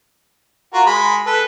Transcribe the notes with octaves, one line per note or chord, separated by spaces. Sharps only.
F4 F#4 A#4
G#3 B5
A4 B4